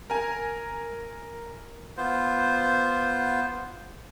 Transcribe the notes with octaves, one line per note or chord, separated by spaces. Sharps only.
A#4 G#5
B3 F4 C5